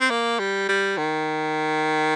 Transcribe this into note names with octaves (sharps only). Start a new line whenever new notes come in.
C4
A#3
G3
G3
D#3